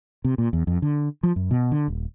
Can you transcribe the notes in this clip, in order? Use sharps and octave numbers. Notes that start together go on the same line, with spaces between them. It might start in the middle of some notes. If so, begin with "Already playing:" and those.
C3
A#2
E2
F2
D3
F3
F#2
B2
D3
D#1